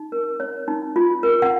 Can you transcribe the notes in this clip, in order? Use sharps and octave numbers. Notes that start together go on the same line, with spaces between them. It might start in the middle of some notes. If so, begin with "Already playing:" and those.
Already playing: D#4
A#4
C#5
D#4
F4
A#4
F#5